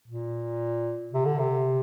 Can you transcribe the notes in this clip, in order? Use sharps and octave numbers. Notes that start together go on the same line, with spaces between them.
A#2
C3
D3
C3